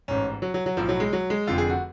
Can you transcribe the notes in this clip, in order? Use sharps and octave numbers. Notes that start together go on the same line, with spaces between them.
A1 G#2 C#4
F#3
F#3
F#3
B1 A2 F3
F#3
G#3
F#3
G#3
F1 F2 D3 F4
G#4
F#4